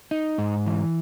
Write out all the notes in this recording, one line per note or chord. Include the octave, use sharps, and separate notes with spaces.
D#4
G#2
E3